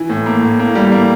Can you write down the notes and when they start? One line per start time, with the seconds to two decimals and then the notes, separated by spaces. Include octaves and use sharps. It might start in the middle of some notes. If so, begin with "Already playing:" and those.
Already playing: E3
0.10 A2
0.26 A#3
0.43 A2
0.59 A#3
0.75 G3
0.92 A#3